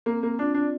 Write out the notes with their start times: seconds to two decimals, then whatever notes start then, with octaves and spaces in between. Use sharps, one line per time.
0.06 A#3 C4
0.22 A#3 C4
0.39 D4 F4
0.54 D4 D5